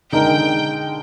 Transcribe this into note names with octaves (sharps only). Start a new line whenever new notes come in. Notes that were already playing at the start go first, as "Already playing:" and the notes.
D3 G#3 D#4 A#4 G5